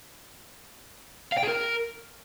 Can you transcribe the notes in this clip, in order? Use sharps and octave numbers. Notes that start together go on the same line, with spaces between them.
F5
G5
G#4
A#4